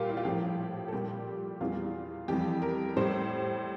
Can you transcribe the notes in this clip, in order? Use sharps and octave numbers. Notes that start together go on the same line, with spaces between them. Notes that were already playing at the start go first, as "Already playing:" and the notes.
Already playing: A#2 G3 F4 G4 A#4
E4
F4
A2 F3 G4
A4
A#2 G3 G4
E2 E3 G3 F4
F2 E3 G3 G4
A#4
A2 G3 C5